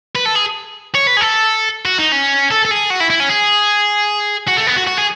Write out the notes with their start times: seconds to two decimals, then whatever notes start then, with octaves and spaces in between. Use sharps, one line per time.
0.16 B4
0.26 A4
0.36 G#4
0.95 C#5
1.07 B4
1.17 G#4
1.21 A4
1.86 F#4
1.98 D#4
2.12 C#4
2.51 A4
2.65 A4
2.71 G#4
2.90 F#4
3.00 E4
3.10 E4
3.20 C#4
3.30 G#4
4.48 F#4
4.57 A3
4.67 B3
4.77 F#4
4.87 F#4
4.98 G#4